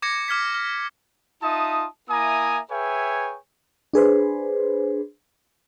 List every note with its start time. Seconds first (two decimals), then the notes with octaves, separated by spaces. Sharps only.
0.02 D6 G#6 A#6 C#7
0.28 D6 F6 G#6 B6
0.54 F6
1.42 D#4 F4 E5 A5 D#6
2.09 A#3 E4 E5 G#5 A#5 D#6
2.70 G#4 B4 C#5 E5 G5 G#5
3.93 D4 G#4 B4 C5